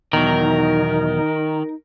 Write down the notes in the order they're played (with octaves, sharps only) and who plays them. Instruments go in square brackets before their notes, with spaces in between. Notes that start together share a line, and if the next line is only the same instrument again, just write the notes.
[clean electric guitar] E2 B2 F#3 [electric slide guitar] D#3 [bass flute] D#4 [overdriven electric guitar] A#4